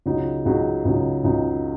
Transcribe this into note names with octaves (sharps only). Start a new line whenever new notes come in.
C#2 C#3 F#3 D#4
C#2 C#3 F#3 D#4
C#2 C#3 F#3 D#4
C#2 C#3 F#3 D#4